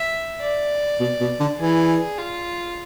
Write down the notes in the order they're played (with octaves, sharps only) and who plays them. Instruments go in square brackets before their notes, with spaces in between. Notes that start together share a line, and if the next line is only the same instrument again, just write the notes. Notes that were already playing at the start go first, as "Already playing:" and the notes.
Already playing: [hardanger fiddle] E5
D5
[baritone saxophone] B2
B2
D3
[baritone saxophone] E3 [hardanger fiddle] G#4
[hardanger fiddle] F4